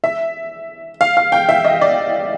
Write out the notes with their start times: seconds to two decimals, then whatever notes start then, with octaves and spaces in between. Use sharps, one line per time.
0.04 E5
1.01 F5
1.17 F5
1.32 G5
1.49 E5
1.65 D#5
1.81 D5